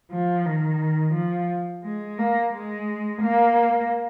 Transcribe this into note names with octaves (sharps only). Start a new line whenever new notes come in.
F3
D#3
F3
G#3
A#3
G#3
A#3